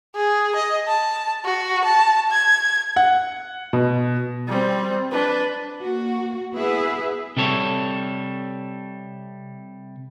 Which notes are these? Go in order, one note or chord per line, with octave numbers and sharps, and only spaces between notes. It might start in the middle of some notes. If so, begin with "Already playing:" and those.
G#4
D#5
A5
F#4
A5
G#6
F#5
B2
G3 C4
D4 B4
A#3 F#4
B3 E4 G#4 B4 E5
C3 G3 A4 C#5